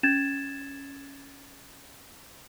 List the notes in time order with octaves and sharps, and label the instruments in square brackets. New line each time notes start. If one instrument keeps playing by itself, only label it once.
[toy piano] C#4 [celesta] G#6 A6 E7